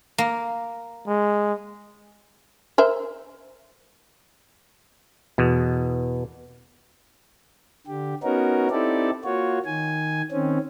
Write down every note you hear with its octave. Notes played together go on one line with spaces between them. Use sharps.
A#3
G#3
A#4 C5 E5
E2 B2
D3 G4
B3 C#4 D#4 F#4 A#4
C4 D#4 E4 G4 A4 D5
A#3 F4 F#4 C#5
D#3 G#5
D#3 C4 C#4